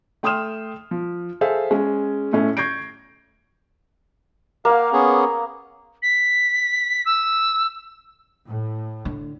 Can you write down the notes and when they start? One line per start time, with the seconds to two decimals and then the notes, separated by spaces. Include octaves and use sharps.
0.23 A3 G5 C6 D#6 F6 E7
0.91 F3
1.41 G#4 A4 C5 E5 F5
1.71 G#3 C#4
2.33 A2 A3 C#4
2.57 C#6 G6 G#6 A#6 C7 D7
4.65 A#3 F5 F#5
4.92 B3 C#4 G#4
6.02 B6
7.05 E6
8.47 A2
9.05 D3